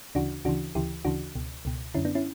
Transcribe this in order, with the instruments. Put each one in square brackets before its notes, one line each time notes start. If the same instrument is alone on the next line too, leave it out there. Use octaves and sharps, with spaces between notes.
[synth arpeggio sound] D2 C#3 E3 D4 F#4
D2 C#3 E3 D4 F#4
D2 C#3 E3 E4 G4
D2 C#3 E3 D4 F#4
C#2 B2
C#2 B2
F#2 D3 C#4 E4
B3 D4
C#4 E4